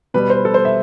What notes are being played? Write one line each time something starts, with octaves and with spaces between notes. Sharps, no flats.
B2 G3 B4
C5
A4
C5
E5